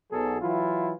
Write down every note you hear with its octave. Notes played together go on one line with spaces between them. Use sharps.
B1 B2 F#3 G#4 A4
E3 F#3 E4 F4